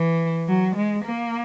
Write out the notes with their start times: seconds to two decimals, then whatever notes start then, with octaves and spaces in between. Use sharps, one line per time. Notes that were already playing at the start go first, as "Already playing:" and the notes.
Already playing: E3
0.48 F#3
0.76 G#3
1.05 A#3